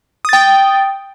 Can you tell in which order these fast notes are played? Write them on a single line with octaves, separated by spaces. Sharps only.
D#6 A6 G5